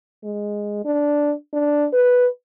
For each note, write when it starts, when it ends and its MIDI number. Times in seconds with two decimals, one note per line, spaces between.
0.24 0.81 56
0.85 1.33 62
1.53 1.86 62
1.93 2.27 71